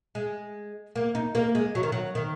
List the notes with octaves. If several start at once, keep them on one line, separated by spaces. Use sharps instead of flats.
G#3
A#3
D#4
A#3
G#3
F#3
D#3
F#3
D#3